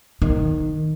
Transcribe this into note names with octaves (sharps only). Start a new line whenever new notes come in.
D#3